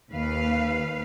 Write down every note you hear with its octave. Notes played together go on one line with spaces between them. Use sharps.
D#2 B4 F5